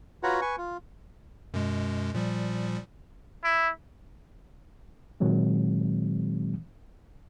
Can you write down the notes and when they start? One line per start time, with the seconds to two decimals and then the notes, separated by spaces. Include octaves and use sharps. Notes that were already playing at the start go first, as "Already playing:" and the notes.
0.23 F4 F#4 B4 C#5 F#5 A#5
0.41 B4 G#5 C#6
0.58 F4
1.54 F#2 B2 G#3
2.14 A#2 F3 G3
3.44 E4
5.20 A#2 D#3 F#3 G#3 C4